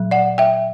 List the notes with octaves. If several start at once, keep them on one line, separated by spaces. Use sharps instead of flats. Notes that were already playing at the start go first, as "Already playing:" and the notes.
Already playing: A#2 F#3
D5 F#5
E5 G5